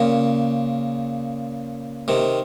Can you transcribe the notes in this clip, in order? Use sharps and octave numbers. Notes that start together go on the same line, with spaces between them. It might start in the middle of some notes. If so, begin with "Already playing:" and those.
Already playing: A#2 C#3
C3 D#3